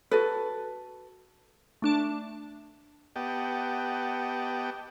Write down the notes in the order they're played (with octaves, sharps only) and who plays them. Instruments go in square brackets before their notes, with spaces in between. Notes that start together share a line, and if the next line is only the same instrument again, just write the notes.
[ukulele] F#4 A4 B4
[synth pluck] A3 D4 A5
[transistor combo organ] B3 G4 D#5 F#5 G5 A5